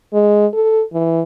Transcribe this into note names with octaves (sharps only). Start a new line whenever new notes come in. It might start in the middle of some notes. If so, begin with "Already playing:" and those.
G#3
A4
E3